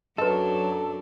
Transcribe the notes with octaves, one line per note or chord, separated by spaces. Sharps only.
F#2 F#3 D4 A4 B4 D#5